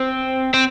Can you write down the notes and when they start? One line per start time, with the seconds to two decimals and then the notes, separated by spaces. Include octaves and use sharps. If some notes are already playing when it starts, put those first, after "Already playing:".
Already playing: C4
0.54 C4